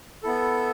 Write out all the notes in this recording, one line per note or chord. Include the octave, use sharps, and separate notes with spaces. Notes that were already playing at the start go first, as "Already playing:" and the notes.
B3 E4 A4